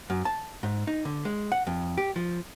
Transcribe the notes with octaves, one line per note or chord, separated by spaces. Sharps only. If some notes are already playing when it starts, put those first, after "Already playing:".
F#2
A5
G#2
D#4
D3
G#3
F#5
F2
G4
F3